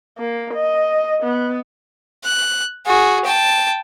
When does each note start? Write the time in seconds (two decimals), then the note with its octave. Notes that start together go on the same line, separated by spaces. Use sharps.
0.18 A#3
0.54 D#5
1.23 B3
2.24 F#6
2.87 F#4 G#4
3.25 G5 A5